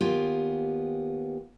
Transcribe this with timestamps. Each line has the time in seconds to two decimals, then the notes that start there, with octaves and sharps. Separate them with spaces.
0.01 D#2 B3 F4 G4 G#5